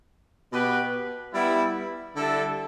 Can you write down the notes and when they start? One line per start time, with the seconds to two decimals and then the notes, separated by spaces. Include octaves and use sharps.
0.51 B2 B3 G4 B4
1.33 G3 B3 E4
2.16 D3 G3 E4 A4